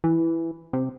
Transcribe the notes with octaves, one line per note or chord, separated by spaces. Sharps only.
E3
C3